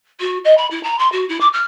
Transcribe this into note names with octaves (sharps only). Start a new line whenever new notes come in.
F#4
D#5
B5
E4
A#5
C6
F#4
E4
D6
F6